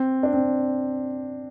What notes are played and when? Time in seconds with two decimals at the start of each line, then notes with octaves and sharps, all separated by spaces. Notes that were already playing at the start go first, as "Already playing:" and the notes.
Already playing: C4
0.23 D4
0.33 C4